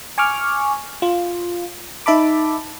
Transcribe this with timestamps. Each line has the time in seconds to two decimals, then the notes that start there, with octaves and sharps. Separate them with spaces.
0.18 G#5 C#6 D6 F6
1.02 F4
2.06 D#4 E5 A5 B5 D6